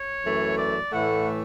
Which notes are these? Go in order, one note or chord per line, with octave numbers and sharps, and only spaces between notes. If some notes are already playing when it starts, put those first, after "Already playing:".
Already playing: C#5
F#2 E3 A3
D5
A2 E3 A3 F#5